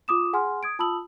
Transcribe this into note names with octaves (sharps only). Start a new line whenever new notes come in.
F4 D6 D#6 E7
G#4 F#5 G#5 C6 F6
D#6 G#6 D7
F4 A5 B5 D#6 E6 F#7